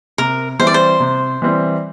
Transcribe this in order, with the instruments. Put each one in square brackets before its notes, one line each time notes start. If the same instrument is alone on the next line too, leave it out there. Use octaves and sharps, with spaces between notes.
[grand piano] C3 [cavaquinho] A#4
[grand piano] E3 G3 C4 E4 [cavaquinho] C5
[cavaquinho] D5
C5
[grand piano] C3
E3 G3 C4 E4